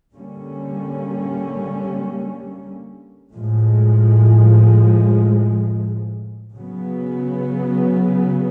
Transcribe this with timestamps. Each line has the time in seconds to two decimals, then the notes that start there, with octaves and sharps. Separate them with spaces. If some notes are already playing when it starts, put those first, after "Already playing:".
0.14 D3 G3 A#3 C#4
3.34 A2 F3 G#3
6.54 C#3 F#3 B3